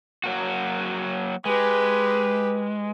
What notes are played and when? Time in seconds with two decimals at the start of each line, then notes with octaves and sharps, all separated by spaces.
0.24 F#3 A#3 F#4
1.45 G#3 G4 B4